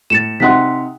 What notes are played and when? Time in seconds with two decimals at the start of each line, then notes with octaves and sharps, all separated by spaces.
0.10 A2 A6 C#7 E7
0.40 C3 D#4 F#5 C6 B6